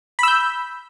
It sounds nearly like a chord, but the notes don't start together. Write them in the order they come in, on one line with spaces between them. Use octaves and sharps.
B5 E6 G6